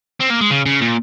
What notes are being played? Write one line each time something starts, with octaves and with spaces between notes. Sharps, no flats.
C4
A#3
G#3
C#3
C#3
A#2